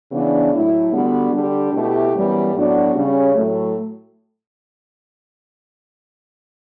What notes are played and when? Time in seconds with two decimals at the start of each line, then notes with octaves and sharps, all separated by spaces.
0.12 C#3 E3 B3 D4
0.53 A2 F#3 A3 E4
0.92 D3 G3 B3 D4 F#4
1.32 D3 G3 D4 G4
1.73 B2 A3 E4 G4
2.13 F#2 E3 G3 B3
2.53 A2 F#3 B3 D4 F#4
2.94 C#3 G3 C#4
3.35 A2 F#3 A3